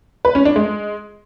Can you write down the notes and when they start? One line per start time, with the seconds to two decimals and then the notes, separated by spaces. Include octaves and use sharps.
0.25 B4
0.35 C#4
0.45 D4
0.56 G#3